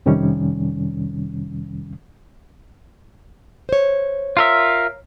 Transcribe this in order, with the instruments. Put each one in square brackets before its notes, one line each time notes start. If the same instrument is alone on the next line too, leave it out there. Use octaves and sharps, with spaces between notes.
[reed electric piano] F2 C3 D#3 G3 C#4
[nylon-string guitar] C5 C#5
[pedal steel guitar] F4 A#4 E5